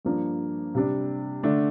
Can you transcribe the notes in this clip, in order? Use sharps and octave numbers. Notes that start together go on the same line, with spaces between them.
G2 F3 A#3 D4
C3 G3 D4
D3 A3 D4